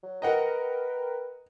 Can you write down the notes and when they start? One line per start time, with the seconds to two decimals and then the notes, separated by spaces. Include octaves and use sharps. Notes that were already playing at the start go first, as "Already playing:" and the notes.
0.03 F#3
0.22 A#4 B4 D#5 F#5 G5 A#5